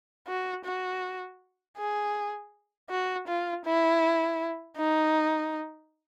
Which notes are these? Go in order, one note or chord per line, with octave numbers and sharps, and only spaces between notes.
F#4
F#4
G#4
F#4
F4
E4
D#4